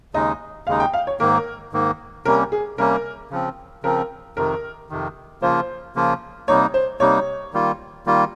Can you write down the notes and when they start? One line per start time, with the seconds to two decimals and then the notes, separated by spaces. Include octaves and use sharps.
0.14 D#2 C#3 G#3 D#4 D#5
0.67 D#2 C#3 G#3 D#4 F5
0.80 G5
0.93 F5
1.07 C#5
1.20 G#2 D#3 A#3 A#4
1.73 G#2 D#3 A#3
2.25 C3 G3 A#3 C#4 A#4
2.52 G#4
2.78 C3 G3 A#3 C#4 A#4
3.30 C#3 F3 C4
3.83 C#3 F3 C4 A#4
4.37 F2 C3 D#3 A#4
4.90 F2 C3 D#3
5.42 C#3 F3 A#3 F4 C5
5.95 C#3 F3 A#3 F4
6.48 C3 G3 A#3 D#4 C#5
6.74 C5
7.00 C3 G3 A#3 D#4 C#5
7.53 D#3 G3 A#3 F4
8.06 D#3 G3 A#3 F4